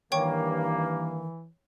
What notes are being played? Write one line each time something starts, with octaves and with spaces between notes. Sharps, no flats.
G2 D#3 E3 A#3 C#5 G5 C#6